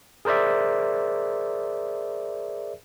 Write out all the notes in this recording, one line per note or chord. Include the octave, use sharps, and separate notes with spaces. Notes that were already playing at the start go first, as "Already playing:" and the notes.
G#4 A#4 C5 D5 E5